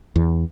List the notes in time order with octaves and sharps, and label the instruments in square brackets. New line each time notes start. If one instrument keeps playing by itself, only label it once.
[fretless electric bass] E2